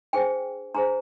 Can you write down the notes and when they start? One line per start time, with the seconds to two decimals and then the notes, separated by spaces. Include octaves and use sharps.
0.13 D4 G#4 C5 G5
0.74 D4 G#4 C5 A#5